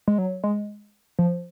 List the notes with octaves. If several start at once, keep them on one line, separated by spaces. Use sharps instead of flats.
G#3
F#3
G#3
F3